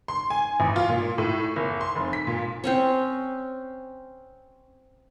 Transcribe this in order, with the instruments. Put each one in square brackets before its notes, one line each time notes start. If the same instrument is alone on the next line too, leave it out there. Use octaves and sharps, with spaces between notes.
[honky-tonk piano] C6
G#5
A1
F4
A#2
A2
F#1
C6
F1
B6
A#2
[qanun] C4 C#4 C#5